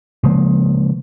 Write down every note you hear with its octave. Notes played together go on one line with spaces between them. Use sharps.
C#3 F3 G#3 A#3